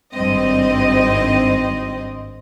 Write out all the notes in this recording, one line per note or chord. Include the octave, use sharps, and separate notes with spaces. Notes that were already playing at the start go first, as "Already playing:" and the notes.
G#1 G2 C4 D#5